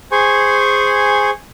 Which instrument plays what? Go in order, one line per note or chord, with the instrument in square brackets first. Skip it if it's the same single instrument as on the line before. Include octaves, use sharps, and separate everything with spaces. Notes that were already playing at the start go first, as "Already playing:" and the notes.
[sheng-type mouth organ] G#4 C5 G#5 C#6